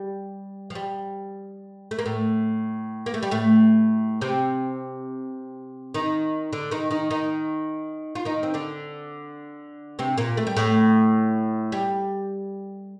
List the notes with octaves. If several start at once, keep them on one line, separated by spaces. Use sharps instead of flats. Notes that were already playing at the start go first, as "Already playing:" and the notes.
Already playing: G3
F3
G3
A3
A#3
A2 A3
A#3
A3
G3
A2 A3
C3 C4
D#3 D#4
D3 D4
D#3 D#4
D#3 D#4
D#3 D#4
F4
D#3 D#4
C4
D3 D4
C3 C4
A#2 A#3
A3
G3
A2 A3
G3